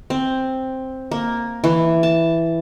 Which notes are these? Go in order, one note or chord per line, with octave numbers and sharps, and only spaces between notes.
C4
A#3
E3
A5